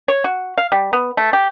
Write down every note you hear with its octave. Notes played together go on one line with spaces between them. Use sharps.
C#5
F#4
F5
G3
B3
A3
G4